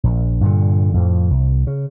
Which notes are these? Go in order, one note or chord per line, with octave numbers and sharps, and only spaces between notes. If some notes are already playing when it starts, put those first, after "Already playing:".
A#1
G2 A#2 D3
F2 A2 F3
C2
C#3